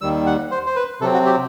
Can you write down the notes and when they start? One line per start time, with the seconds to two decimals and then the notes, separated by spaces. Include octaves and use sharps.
0.01 D#2 D#3 G3 E6
0.26 F#5
0.51 C5
0.67 C5
0.76 B4
1.01 C3 F#3 C4 A4
1.14 F#4
1.26 G4